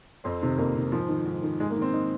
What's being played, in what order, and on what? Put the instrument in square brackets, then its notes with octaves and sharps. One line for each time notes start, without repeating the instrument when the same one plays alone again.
[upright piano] F2 C4
C3 D#3
F2 A#3
C3 D#3
G#2 F3
D#3
G#2
D#3
G#2 G#3
A#3
D#3 C4
D#4